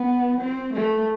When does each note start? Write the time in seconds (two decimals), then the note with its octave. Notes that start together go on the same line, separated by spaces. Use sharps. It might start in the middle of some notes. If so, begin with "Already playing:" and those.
Already playing: B3
0.40 C4
0.73 A3